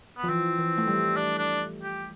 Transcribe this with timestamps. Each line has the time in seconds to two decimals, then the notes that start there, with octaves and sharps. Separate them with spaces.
0.17 B3
0.24 F3
0.29 E3 C4
0.58 E3
0.78 A3
0.88 G3
1.16 D4
1.38 D4
1.83 G4